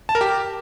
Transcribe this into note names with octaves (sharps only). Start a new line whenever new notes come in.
A5
A#4
G4